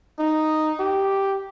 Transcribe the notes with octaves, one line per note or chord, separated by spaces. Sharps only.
D#4
G4